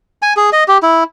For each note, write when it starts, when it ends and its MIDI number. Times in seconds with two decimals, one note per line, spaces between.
0.22 0.33 80
0.37 0.50 68
0.53 0.64 75
0.68 0.78 67
0.83 1.04 64